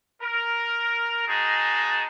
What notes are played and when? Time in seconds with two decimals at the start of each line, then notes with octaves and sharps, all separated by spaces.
0.22 A#4
1.28 G#3 D#4 F#4 G#4 A5 A#5